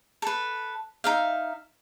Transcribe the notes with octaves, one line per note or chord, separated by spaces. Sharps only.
A4 B4
D#4 E5 F5